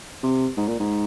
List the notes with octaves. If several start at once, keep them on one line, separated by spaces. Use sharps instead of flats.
C3
G#2
A#2
G#2